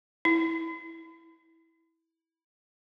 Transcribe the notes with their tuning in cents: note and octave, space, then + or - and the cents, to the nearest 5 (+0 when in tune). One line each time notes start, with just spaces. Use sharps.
E4 -10